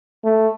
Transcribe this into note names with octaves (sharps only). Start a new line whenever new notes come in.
A3